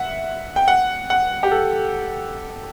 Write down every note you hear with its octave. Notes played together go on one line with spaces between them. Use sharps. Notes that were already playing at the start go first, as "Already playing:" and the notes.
Already playing: E5 F#5
G5
F#5
F#5
G4
A4